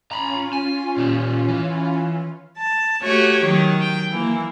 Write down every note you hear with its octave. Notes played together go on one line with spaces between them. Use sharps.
C#4 F4 A#5 B5
G#5
A#2 G4
E3
A5
A3 F#4 G4 C#5
D#3 F#3
G5
E3 A#3